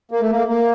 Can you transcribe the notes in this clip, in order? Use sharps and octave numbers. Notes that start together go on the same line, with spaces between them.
A#3
A3
A#3
A#3